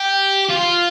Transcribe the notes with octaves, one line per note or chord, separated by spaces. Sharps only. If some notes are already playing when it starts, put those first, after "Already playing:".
Already playing: G4
F4